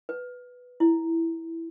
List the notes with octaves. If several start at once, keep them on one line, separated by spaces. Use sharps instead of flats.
B4
E4